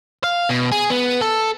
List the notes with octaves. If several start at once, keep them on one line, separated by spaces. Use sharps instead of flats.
F5
B2
G#4
B3
A4